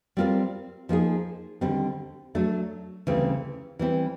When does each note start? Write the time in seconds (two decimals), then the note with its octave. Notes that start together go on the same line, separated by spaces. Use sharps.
0.17 G3 C4 F4 A#4 D5
0.89 F3 A#3 D#4 G#4
1.61 D#2 D3 G3 C4
2.35 F#3 A3 D4
3.07 D2 C#3 E3 G3 C4
3.79 E3 G3 C4 E4